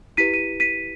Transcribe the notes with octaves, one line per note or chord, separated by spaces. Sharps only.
E4 G4 B4 B6 D#7
D#7
B6 D#7